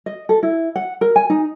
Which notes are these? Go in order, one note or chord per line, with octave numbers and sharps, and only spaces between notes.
D#5
A4
E4
F#5
A#4
G#5
D#4